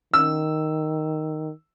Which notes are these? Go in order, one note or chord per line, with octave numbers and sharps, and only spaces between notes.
D#3 E6